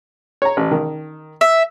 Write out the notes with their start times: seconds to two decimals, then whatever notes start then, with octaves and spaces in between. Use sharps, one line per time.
0.42 C#5 A#5
0.57 A1
0.71 D#3
1.41 E5